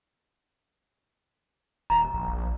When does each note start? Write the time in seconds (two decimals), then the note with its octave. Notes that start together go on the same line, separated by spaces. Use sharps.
1.90 D#1 A#5
2.14 A#1